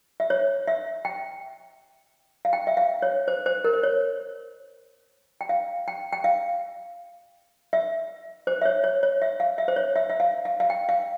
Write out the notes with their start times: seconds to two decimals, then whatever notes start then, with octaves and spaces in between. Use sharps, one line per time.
0.20 E5
0.30 C#5
0.68 E5
1.05 G5
2.45 F5
2.53 G5
2.67 E5
2.77 F5
3.02 C#5
3.28 C5
3.46 C5
3.64 A#4
3.73 C5
3.83 C#5
5.41 G5
5.49 F5
5.88 G5
6.13 G5
6.24 F5
7.73 E5
8.47 C5
8.62 E5
8.65 C#5
8.84 C#5
9.03 C#5
9.22 E5
9.40 F5
9.58 E5
9.68 C5
9.76 C#5
9.96 E5
10.10 E5
10.20 F5
10.45 F5
10.60 F5
10.70 G5
10.89 F5